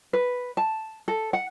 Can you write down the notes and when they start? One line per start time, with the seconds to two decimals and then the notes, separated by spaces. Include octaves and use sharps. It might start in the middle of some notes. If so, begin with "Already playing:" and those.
0.13 B4
0.57 A5
1.08 A4
1.33 F#5